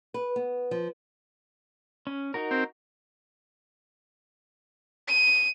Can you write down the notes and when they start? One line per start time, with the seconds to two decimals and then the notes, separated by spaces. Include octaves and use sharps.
0.14 B4
0.36 B3
0.71 F3
2.07 C#4
2.34 D#4 F#4 A#4
2.51 C4
5.07 D#7